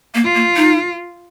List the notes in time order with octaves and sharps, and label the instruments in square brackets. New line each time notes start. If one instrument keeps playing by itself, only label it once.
[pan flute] A#3
[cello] F4
[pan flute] A#3
D#4